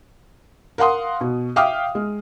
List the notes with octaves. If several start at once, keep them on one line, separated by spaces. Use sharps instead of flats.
A#4 F5 F#5 C6 D#6
B2
E5 F5 G5 D6 D#6 F6
G#3